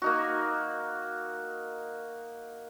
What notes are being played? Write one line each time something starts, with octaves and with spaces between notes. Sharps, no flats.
A#3 D#4 F#4